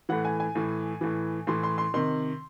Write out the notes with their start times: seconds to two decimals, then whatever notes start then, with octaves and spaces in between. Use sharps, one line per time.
0.09 A2 E3 F#5
0.25 G#5
0.40 G#5
0.55 A2 E3
1.01 A2 E3
1.47 A2 E3 C6
1.63 C6
1.78 C6
1.94 C3 D#3 C6